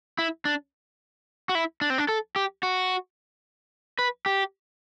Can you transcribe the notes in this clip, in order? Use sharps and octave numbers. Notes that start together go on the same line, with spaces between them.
E4
D4
F#4
E4
D4
C4
D4
A4
G4
F#4
B4
G4